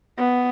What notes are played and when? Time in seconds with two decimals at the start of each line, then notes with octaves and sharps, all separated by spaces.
0.19 B3